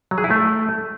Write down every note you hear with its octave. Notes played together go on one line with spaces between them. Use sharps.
F#3
G#4
E4
A3